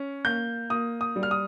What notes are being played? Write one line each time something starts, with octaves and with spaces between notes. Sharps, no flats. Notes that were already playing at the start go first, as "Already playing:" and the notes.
Already playing: C#4
A#3 G6
A#3 D#6
D#6
G3
F6
D#6